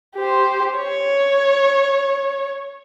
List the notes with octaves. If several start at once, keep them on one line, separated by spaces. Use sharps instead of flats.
G4 C5
C#5